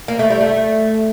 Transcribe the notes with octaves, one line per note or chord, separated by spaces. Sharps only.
A#3
A3
G3
A3